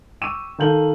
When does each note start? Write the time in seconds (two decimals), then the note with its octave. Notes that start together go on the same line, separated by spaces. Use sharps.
0.21 G5 C#6 D6 E6 D#7 E7
0.58 D#3 A4 F5 G6 F#7